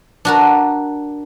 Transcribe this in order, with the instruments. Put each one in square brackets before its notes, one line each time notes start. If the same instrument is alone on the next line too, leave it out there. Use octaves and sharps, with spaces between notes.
[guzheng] D4 F#4 A#4